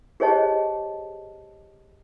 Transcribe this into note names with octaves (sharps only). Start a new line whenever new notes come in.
G4 G#4 C5 C#5 D#5 A5